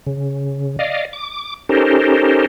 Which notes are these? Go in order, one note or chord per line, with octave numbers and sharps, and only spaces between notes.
C#3
D5 D#5 F5
D6
C#4 D#4 G4 A4 A#4 C5